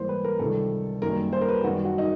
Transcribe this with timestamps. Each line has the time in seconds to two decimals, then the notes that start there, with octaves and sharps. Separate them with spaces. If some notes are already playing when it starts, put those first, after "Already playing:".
Already playing: G#2 E3 G3 A#3 C5
0.09 B4
0.24 A#4
0.39 C#2 C3 D#3 G3 A4
1.02 F#2 D#3 G3 A#3 A#4
1.33 C5
1.41 A#4
1.48 B4
1.64 F#2 D#3 G3 F#4
1.85 F#4
1.98 D#4